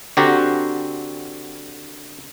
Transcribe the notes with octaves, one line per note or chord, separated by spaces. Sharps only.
D3 C4 F#4 G4 A#5